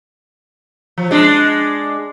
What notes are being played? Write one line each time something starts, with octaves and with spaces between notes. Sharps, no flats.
F3
G#3 D4